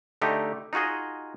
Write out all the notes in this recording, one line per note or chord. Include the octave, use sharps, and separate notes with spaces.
D3 A3 D#4 G4
D#4 F4 F#4 G#4 D#5